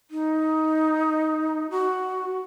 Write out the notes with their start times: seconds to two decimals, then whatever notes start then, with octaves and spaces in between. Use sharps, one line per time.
0.11 D#4
1.71 F#4